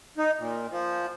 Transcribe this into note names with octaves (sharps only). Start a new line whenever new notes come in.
D#4
A#2
F3